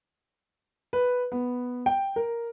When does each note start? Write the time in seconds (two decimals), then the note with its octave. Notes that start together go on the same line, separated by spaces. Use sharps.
0.93 B4
1.32 B3
1.86 G5
2.16 A#4